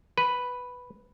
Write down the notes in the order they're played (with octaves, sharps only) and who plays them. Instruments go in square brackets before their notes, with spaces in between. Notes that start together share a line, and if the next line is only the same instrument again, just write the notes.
[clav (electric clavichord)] B4